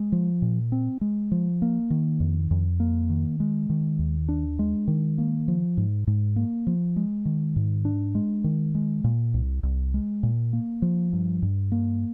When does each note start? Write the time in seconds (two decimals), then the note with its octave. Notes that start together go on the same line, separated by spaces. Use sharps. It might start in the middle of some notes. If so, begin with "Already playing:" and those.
Already playing: G#3
0.12 F3
0.42 A#2
0.72 C4
1.01 G#3
1.32 F3
1.62 A#3
1.90 D#3
2.20 F2
2.51 F2
2.80 A#3
3.09 D#3
3.40 G#3
3.70 D#3
3.99 D#2
4.29 D4
4.59 G#3
4.88 D#3
5.18 A#3
5.48 F3
5.77 G#2
6.07 G#2
6.36 A#3
6.67 F3
6.96 G#3
7.25 D#3
7.56 G#2
7.85 D4
8.15 G#3
8.44 D#3
8.75 G#3
9.04 A#2
9.34 C2
9.63 C2
9.94 G#3
10.23 A#2
10.53 A#3
10.82 F3
11.13 G2
11.42 G2
11.72 A#3